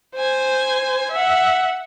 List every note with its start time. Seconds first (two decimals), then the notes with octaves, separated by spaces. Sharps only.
0.15 C5 G#5
1.12 E5 F#5